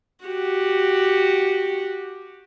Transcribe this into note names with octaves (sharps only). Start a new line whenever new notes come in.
F#4 G4